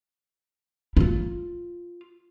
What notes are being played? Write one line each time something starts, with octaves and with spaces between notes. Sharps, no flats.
E4 F4